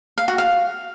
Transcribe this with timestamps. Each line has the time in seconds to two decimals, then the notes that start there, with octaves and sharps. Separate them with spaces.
0.18 F5
0.28 F#4
0.38 F5